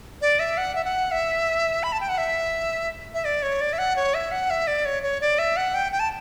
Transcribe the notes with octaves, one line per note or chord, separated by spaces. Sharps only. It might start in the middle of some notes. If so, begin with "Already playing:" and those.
D5
E5
F#5
E5
F#5
E5
B5
A5
G5
F#5
E5
E5
D5
C#5
D5
E5
F#5
C#5
E5
F#5
E5
D5
C#5
C#5
D5
E5
F#5
G5
G5
A5